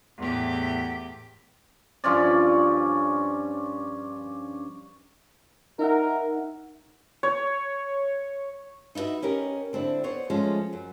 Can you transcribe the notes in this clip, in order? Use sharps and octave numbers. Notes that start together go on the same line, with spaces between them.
E2 A2 G4
G2 F3 C#4 D5
D#4 A#4 E5 F#5
C#5
D#4 E4 F#4 B4 E5
C#4 G4 A#4 D#5
D3 C4 D4 E4
B3 C5 C#5
F3 G#3 A3 C#4 F4
F#2